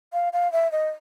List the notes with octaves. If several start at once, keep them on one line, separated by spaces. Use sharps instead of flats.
F5
F5
E5
D#5